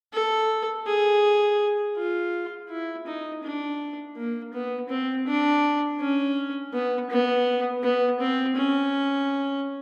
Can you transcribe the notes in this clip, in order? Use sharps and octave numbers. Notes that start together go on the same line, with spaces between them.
A4
G#4
F4
E4
D#4
D4
A#3
B3
C4
D4
C#4
B3
B3
B3
C4
C#4